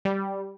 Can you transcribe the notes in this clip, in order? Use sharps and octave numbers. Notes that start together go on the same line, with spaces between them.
G3